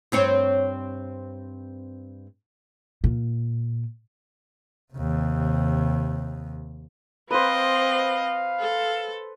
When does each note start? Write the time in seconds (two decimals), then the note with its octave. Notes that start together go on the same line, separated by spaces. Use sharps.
0.12 G2 C4 C#5
3.04 A#2
4.93 D#2 C3
7.31 C4 B4 C5 D#5 F5
8.60 A4